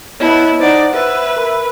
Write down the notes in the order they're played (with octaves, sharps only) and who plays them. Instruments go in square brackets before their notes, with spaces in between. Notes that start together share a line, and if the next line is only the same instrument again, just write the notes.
[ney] B3 [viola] E4 [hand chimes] C#5 D#5 A5
[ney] D#4 [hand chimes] C5 F#5 [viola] D5
[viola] B4 [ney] E5
[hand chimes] A#4 B5